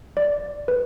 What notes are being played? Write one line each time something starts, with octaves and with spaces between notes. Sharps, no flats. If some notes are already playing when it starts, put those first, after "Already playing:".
D5
B4